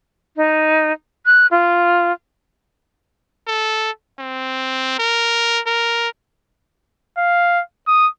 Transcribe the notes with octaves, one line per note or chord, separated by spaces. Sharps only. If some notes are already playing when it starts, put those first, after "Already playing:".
D#4
F#6
F4
A4
C4
A#4
A#4
F5
D#6